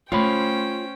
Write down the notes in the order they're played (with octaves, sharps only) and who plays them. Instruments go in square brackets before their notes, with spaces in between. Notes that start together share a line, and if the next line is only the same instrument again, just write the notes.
[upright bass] A3 [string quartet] C#4 C5 G5 [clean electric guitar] F4 C#5 B5